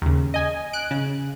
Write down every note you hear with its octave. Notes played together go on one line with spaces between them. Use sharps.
D#2 C#3
D#5 G#5
F#6 D7
C#3